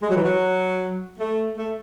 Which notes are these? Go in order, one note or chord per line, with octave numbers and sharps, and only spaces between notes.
G#3
F#3
E3
F#3
A3
A3